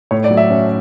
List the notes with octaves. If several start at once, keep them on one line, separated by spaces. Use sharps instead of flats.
A2 C#5
D5
F#3
E5
C#4